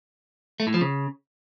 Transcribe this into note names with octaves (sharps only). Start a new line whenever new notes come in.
A3
A2
F3
C#3